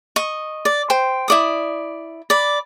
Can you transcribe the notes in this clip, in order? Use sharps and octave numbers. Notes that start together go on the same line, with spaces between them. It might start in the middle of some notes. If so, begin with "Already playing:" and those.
D#5 C#6
D5
C5 G5
E4 D5 D#6
D5 B5